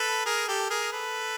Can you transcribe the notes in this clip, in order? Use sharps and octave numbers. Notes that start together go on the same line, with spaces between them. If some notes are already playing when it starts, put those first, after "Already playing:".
Already playing: A4 B4
G#4 A#4
G4 A4
G#4 A#4
A4 B4